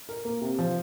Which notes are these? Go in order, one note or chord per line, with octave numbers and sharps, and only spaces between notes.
A#4
A#3
C3
F3